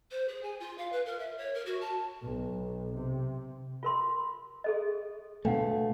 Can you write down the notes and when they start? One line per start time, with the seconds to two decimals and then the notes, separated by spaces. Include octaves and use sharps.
0.11 C5
0.28 G#4
0.43 G#5
0.60 F4
0.78 F5
0.92 B4
1.06 A#4
1.19 E5
1.38 C#5
1.54 A#4
1.66 F#4
1.81 A5
2.22 B1
2.94 C3
3.83 F4 A#4 C6
4.64 G#4 A4 D#5
5.45 B2 A3 D4 F5 F#5